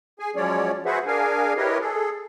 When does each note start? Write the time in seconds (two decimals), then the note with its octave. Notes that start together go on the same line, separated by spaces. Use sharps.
0.19 G#4 G#5
0.36 F3 F#3 G#3 C#4 C#5 D5
0.86 F#4 G#4 B4 C5 E5 F#5
1.07 D4 G#4 A#4 F5 G#5
1.57 E4 G4 A#4 B4 C#5 D#5
1.81 G#4 A4